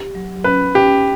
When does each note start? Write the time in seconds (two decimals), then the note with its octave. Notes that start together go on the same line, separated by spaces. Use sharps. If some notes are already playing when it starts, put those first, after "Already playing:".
Already playing: G4
0.15 F#3
0.44 C#4 B4
0.75 C#4 G4